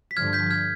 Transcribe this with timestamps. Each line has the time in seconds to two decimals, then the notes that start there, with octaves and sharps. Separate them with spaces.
0.11 B6
0.17 G2 D3 F3 F6 G#6
0.33 G6 B6
0.50 F6 G#6